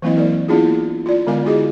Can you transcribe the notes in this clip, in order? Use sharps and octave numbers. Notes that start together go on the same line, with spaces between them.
E3 F#3 A#3 C4 E4 D#5
A#4 D5
A#3 B3 D4 E4 F4 G#4
F4 D5
D3 G#3 B3 A#4 F5 G#5
E4 F#4 G#4 D#5